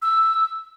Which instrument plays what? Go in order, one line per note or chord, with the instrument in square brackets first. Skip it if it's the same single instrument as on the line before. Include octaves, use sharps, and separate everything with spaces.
[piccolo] E6